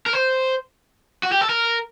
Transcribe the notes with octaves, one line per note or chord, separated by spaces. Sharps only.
A#4
C5
F#4
G4
A4
A#4